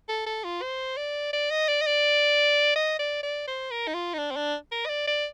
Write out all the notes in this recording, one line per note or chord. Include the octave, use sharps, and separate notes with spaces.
A4
A4
F4
C5
D5
D5
D#5
D5
D#5
D5
D#5
D5
D5
C5
A#4
D#4
F4
D#4
D4
C4
D4
A#4
D#5
D5
D5